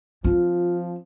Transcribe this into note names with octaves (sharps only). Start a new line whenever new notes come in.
F3 C4 D4 F4